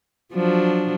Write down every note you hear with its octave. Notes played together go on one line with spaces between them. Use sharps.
F3 F#3 D4